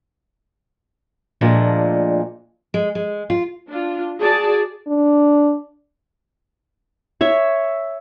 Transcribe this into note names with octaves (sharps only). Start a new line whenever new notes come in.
A#2 F3 G#3 A3 D4
G#3
G#3
F4
D4 F4
F#4 G#4 D5 A5
D4
C#5 E5